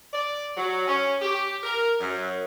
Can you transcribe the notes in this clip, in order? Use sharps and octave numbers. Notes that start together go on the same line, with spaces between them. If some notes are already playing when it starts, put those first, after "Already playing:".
D5
F#3
C#4
G4
A#4
F#2